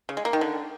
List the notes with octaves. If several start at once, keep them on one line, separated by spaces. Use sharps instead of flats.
C#3
G#3
A#3
D#3
D3